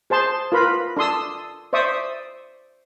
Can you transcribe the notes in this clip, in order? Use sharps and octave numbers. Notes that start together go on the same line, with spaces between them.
G#4 C5 A5 C6
F4 A#4 B4 B5
D4 A4 C6 D#6 E6
C5 D5 E5 C#6 D#6